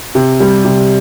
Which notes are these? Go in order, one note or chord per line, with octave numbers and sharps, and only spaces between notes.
C3
G3
C3